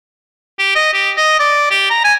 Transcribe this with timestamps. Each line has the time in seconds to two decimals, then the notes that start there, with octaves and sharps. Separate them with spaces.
0.59 G4
0.75 D#5
0.93 G4
1.17 D#5
1.39 D5
1.71 G4
1.90 A#5
2.04 G#5